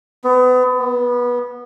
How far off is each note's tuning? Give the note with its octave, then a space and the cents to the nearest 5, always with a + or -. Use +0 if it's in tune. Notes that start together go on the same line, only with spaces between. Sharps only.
B3 +35
B3 -20